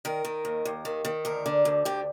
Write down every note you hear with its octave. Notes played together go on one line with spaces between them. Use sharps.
D#3 A#4
D#3
D#2
D#2
D#3
D#3
D2 A#4
D3
D2
D3 G4